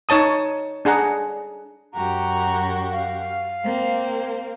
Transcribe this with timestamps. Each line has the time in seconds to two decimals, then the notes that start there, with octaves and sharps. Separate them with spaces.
0.09 D#4 C#5 A5 D#6
0.85 D4 G#4 F#5 A#5
1.94 F#2 F#4 G4 A#5
2.92 F5
3.64 A#3 C4